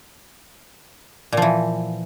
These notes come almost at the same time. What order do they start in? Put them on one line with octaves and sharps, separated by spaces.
A#2 F3 E3